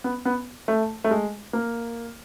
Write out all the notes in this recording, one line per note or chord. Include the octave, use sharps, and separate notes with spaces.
B3
B3
A3
A3
G#3
A#3